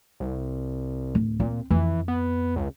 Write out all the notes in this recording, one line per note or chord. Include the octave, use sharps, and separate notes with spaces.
C2
D1
A#2 C4
F2 E3
B3
C#2